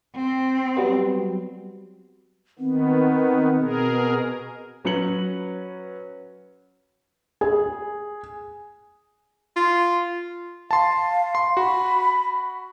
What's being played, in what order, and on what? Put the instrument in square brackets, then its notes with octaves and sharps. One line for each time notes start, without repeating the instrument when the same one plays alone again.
[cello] C4
[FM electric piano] F#3 G3 B3
[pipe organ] D#3 B3 [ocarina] C4
[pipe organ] B2 G#4 A#4
[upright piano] F#3 C#4 B4 C#5 C#7 F#7
[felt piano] G#4
[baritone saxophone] F4
[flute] F5 [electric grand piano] A5 C6
[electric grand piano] C6
[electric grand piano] F#4 [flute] B5